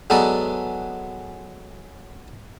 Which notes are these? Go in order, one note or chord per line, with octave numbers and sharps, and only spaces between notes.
F#3 G#3 B3 A4 B4 D5